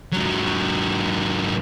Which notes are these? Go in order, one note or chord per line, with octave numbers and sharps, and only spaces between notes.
G#2 F#3